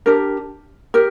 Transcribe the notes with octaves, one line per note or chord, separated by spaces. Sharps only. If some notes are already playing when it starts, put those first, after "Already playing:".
D4 G4 A#4
G4 A#4